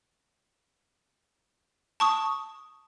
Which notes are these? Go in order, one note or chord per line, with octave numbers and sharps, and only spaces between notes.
A5 C#6 D#6